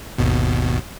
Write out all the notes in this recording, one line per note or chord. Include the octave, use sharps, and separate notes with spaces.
G#1 D#2 B2